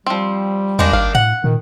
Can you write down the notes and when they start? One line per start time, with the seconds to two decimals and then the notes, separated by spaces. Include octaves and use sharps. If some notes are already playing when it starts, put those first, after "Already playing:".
0.06 F3 G3 C4
0.79 E2 D#3 G#3 A#3 D4
0.93 G#1 F5
1.15 A2 F#5
1.44 A#2 D#3